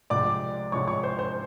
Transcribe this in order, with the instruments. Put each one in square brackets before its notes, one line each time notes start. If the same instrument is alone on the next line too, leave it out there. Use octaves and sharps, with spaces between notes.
[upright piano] C2 C3 F3 G#3 C4 D5 D6
C2 C3 F3 G#3 C4 C#5 C#6
C#5 C#6
C5 C6
C5 C6